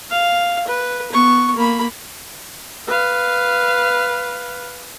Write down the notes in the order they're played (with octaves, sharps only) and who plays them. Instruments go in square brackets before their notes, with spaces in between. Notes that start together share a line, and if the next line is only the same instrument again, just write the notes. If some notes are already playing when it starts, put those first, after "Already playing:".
[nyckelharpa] F5
B4
B3 C#6
A#3 B5
[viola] B4 F5